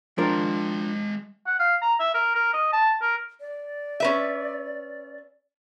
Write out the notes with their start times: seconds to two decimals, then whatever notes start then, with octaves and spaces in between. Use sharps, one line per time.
0.18 F3 G#3 D4 A#4 G5
1.47 F#5
1.60 F5
1.82 A#5
2.00 E5
2.14 A#4
2.35 A#4
2.54 D#5
2.73 A5
3.02 A#4
3.41 D5
4.00 C#4 B4 E5